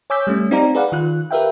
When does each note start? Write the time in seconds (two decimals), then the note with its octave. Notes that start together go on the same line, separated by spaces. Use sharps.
0.10 C#5 G#5 D6 E6 G6 B6
0.27 G3 A3 C#4
0.51 C4 D#4 G4 D5 F5 A#5
0.75 G#4 B4 D5 F5 F#5
0.92 D#3 F4 F#6
1.31 G4 A#4 B4 E5 F5 G5